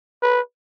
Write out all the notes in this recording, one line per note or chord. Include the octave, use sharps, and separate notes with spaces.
B4